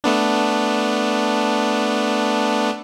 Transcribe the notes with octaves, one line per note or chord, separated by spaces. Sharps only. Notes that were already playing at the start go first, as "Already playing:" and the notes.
A3 B3 D4